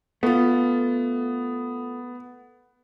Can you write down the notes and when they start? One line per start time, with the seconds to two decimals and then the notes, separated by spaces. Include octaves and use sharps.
0.23 A3 B3 F4